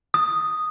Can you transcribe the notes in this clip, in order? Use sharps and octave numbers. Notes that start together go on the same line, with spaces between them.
D#6